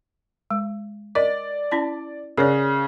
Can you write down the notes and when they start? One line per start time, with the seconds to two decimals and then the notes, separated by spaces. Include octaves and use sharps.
0.51 G#3
1.15 A#4 D5 D#5
1.72 C#4 E4 A5
2.38 C#3 A#4 C#5 D5